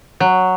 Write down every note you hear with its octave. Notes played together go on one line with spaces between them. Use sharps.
F#3